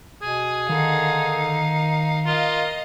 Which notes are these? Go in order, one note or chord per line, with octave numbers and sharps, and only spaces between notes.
B2 G#4 G#5
D3 D#3 D#4 F5
F4 A#4 D#5 F5